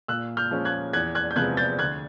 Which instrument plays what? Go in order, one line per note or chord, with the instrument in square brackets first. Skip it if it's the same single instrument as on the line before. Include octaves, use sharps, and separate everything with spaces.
[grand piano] A#2 E6 F#6
F6 G6
F3 G#3 C#4
F#6 G#6
E2 F#6 G#6
F#6 G#6
G6
C3 F3 G#3 B3 F#6 G#6
G6 A6
D2 F#6 G#6